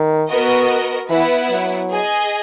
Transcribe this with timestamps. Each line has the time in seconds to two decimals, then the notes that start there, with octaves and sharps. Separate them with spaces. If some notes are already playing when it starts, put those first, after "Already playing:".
Already playing: D#3
0.29 B3 F#4 A#4 D#5
1.10 E3 B3 E4 B4 F#5
1.50 F#3
1.90 G#4 D#5 G#5